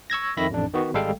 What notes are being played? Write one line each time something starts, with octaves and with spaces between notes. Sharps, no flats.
C#6 E6 G#6 A#6
F2 D#3 E5 B5 A#6
A1 F2 D4
D#3 B3 F#4
G#1 G3 G#3 A4 F5 G5